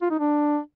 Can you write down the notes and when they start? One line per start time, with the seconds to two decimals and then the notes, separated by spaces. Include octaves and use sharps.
0.02 F4
0.11 D#4
0.19 D4